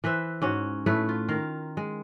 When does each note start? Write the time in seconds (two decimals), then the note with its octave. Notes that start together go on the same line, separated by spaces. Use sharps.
0.04 E3 B4 C5 E5
0.42 G#2 C#4 F#4
0.86 A2 A3 E4 B4
1.09 F4
1.29 D#3 A#4 F5
1.77 G#3